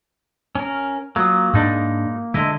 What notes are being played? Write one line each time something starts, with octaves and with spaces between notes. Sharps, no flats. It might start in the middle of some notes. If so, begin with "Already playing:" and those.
C#4 A#4
F#3 A#3 F4 D#6
G#2 G#3 D4 D#4
D3 G#3 E4 D#5